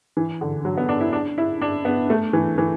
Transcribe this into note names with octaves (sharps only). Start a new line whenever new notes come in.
E3
D3
F#3
B3
D4
E4
D4
E4
D4
B3
A3
E3
E3